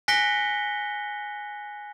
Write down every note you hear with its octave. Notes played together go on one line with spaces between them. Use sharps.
G#5 F#6 A#6 B6 C#7 G7